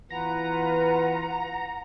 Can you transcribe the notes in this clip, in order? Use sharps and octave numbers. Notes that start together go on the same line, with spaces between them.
E3 B3 F4 B4 F#5 A#5